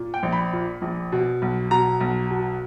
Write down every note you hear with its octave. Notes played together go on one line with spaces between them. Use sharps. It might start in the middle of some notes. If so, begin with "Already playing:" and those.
Already playing: A#2
G5
A#1
B5
A#2
A#1
B2
B1
B2 A#5
B1
B2